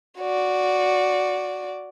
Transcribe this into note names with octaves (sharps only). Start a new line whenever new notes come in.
F#4 D5